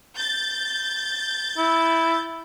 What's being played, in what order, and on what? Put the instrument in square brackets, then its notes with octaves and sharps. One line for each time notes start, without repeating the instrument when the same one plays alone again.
[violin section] G6 A6
[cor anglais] E4